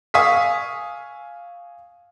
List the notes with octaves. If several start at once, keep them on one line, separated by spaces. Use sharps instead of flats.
F5 G#5 C#6 D#6 E6 B6